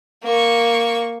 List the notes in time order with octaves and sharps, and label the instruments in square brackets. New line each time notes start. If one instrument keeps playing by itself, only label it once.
[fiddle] A#3 C#6